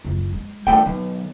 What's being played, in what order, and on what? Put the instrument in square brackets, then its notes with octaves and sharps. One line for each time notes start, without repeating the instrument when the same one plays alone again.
[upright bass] F#1 C#2
G#3
[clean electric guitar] G2 A3 G5 [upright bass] E3 D#4
[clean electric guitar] B1 [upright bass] D#3